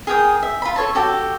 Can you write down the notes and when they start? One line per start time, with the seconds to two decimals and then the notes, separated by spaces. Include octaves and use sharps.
0.07 G#4 A#4 G5 D#6
0.43 E5
0.62 F4 B5
0.76 A4 C#5 A5
0.95 F#4 G4 A4